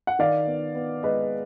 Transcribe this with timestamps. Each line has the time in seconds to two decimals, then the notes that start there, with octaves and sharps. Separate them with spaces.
0.07 F#5
0.19 D#3 D5 F5
0.47 B3
0.75 B3
1.03 G#3 B4 D#5